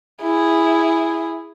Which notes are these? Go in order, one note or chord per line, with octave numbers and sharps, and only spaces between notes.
E4 G#4